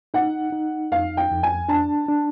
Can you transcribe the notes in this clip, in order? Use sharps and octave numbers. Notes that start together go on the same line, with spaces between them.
D#4 F#5
D#4
F2 F5
G5
F2
G#5
D4 A5
D4